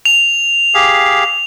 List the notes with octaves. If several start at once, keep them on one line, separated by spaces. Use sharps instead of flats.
F7
G4 G#4 F5